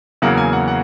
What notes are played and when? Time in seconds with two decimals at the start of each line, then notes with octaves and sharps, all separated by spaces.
0.22 E2 C#3 F#3 A#3 F#5
0.37 G#5
0.53 F#5
0.68 F#5